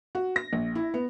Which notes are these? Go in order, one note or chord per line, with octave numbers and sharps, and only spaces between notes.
F#4
A#6
A#1
E4
B3